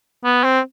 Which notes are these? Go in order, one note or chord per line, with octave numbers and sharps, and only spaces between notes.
B3
C4